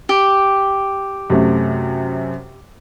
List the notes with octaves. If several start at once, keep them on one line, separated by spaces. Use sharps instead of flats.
G4
F#2 C3 A3